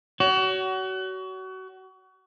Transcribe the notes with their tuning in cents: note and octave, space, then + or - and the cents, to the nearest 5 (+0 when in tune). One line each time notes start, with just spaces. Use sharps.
F#4 +30 C#5 +35